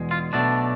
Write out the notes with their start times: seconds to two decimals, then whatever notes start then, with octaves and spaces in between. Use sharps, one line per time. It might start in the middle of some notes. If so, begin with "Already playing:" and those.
Already playing: E2 B2 G#3
0.11 F4
0.33 B1 B2 A3 D4 D5